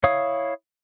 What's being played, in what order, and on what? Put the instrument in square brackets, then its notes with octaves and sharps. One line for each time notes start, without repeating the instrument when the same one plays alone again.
[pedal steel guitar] E4 C#5 F5 D#6